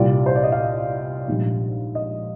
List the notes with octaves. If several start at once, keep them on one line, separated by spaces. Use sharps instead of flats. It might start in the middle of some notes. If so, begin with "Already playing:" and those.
Already playing: C2 A#2 G3 D5
C5
D5
D#5
F5
A#1 G#2 G3 D4
D#5